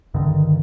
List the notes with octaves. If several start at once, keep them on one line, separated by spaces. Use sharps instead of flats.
G2 D3 D#3